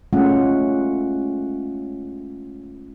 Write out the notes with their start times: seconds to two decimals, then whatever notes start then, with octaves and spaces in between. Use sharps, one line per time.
0.13 G#3 A3 C#4 F4 F#5